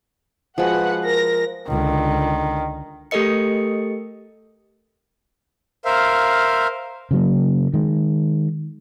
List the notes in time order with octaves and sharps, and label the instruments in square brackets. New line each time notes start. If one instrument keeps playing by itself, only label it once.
[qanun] F3 G#3 [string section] F#4 B4 F#5
[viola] A#4 [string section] A#6
[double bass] C#2 D3 [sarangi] D#3
[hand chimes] A3 G4 A4 A#4 D#5 C#7
[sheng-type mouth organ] A#4 C5 E5 F5
[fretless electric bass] C#3 F#3 A#3
D#3 G#3